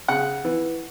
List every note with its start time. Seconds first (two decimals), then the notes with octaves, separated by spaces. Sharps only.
0.08 C#3 F#5
0.45 E3